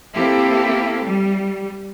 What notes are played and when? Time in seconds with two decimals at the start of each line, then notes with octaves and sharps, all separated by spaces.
0.15 A#3 C4 E4 G4 A4
1.05 G3